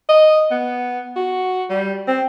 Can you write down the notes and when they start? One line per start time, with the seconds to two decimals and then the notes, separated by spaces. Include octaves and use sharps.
0.09 D#5
0.51 B3
1.16 F#4
1.70 G3
2.08 C4